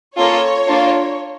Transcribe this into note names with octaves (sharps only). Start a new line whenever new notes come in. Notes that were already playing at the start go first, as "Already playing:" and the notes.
A#3 C#4 F4 A4 C#5
A#3 D4 F4 A4